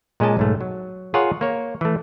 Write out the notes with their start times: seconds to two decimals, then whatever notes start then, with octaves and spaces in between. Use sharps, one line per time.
0.20 A#2 G#3 C#4 D#5 A5
0.37 B1 G#2 A3
0.61 F#3
1.14 F4 G#4 A#4 C#5 F#5
1.41 A#3 C#5
1.81 E3 A3